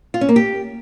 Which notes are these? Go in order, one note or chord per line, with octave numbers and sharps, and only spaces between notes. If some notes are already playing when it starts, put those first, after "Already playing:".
F4
C#4
A#3
G4